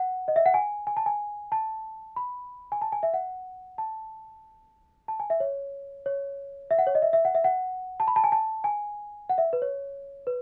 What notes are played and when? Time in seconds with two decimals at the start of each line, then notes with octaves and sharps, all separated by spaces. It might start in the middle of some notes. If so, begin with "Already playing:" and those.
Already playing: F#5
0.28 D#5
0.36 E5
0.46 F#5
0.54 G#5
0.87 G#5
0.97 A5
1.06 G#5
1.52 A5
2.16 B5
2.72 G#5
2.82 A5
2.92 G#5
3.03 E5
3.14 F#5
3.78 A5
5.08 A5
5.20 G#5
5.30 E5
5.40 C#5
6.06 C#5
6.71 E5
6.78 F#5
6.87 C#5
6.95 D#5
7.02 E5
7.13 E5
7.25 F#5
7.34 E5
7.44 F#5
8.00 A5
8.08 B5
8.16 A5
8.24 G#5
8.32 A5
8.64 G#5
9.29 F#5
9.38 E5
9.53 B4
9.62 C#5
10.27 B4